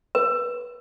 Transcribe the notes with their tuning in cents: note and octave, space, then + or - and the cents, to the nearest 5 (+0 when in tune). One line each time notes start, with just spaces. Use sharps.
B4 -25